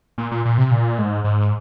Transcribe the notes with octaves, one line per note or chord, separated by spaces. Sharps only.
A#2
A#2
A#2
C3
A#2
G#2
G#2